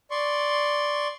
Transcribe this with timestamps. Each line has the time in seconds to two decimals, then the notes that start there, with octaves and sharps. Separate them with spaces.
0.11 D5 C6 C#6